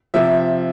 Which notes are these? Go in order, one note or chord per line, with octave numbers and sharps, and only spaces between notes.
C3 F3 E5